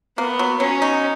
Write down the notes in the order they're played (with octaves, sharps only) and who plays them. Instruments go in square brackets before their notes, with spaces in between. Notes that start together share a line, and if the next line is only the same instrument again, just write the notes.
[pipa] A#3 [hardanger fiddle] B3
[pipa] F#3
[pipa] F#3 [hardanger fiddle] C#4
[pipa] D#4